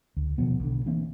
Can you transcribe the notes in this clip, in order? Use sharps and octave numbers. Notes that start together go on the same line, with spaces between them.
D2
B2 D#3 F3 B3
B1 D3
E3 A#3 C4 D4